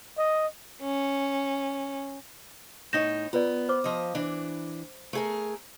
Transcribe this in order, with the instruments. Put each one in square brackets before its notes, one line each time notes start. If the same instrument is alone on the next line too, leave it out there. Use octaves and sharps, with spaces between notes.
[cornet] D#5
[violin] C#4
[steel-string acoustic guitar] A2 D#4 C#5 [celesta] G6 A#6 E7
[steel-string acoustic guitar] B3 [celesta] F4 B4 D5
[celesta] C5 D6
[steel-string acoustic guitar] F3 D#5
E3 D4
A3 G#4 A#4